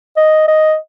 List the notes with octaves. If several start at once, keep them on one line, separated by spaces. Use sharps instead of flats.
D#5
D#5